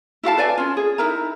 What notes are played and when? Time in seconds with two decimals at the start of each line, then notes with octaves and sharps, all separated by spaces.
0.23 E4 F#4 F5 A5
0.37 B4 D5 G#5
0.58 C#4 F4
0.77 G#4
0.98 D#4 E4 A#4 A#5